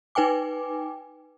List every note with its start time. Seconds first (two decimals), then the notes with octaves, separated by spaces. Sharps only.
0.15 D#4 B4 G5 G#5 D6